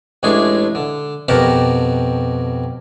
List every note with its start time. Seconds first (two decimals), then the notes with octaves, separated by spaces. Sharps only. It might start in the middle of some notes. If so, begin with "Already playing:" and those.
0.23 A1 A2 G#3 D4 G#4 C#6
0.75 D3
1.28 F2 B2 G4 A#4 F#5 A5